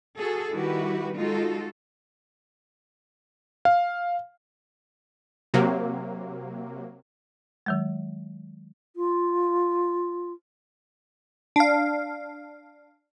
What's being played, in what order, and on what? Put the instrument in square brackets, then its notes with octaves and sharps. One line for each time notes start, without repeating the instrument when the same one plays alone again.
[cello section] F#4 G#4 A4
D#3 G3 E4 F#4 G4 B4
G#3 D#4 F4 F#4 A4
[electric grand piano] F5
[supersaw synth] C3 F#3 A#3
[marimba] D#3 F#3 G#3
[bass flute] F4
[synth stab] D4 F5